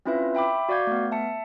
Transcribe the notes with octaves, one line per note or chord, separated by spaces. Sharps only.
C4 C#4 E4 F4 B4 E5
E5 G5 B5 D6
F#4 D5 F5 D6 G6 G#6
A3 B3
E5 A5 C#7